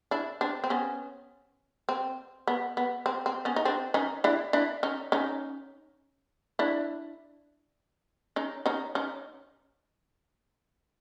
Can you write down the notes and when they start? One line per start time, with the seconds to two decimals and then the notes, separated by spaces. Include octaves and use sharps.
0.11 D4 E4
0.41 C4 D4
0.64 C4
0.70 B3 C#4
1.89 C4
2.48 B3
2.77 B3
3.06 C4
3.26 C4
3.45 B3 C#4
3.56 D#4
3.65 C4 D4
3.94 C#4 D#4
4.24 D4 E4
4.53 D4 E4
4.83 C#4 D#4
5.12 C#4 D#4
6.59 D4 E4
8.36 C#4 D#4
8.66 C#4 D#4
8.95 C#4 D#4